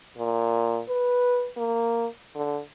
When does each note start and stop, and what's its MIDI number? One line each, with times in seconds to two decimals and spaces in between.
0.18 0.80 46
0.89 1.49 71
1.57 2.07 58
2.36 2.60 50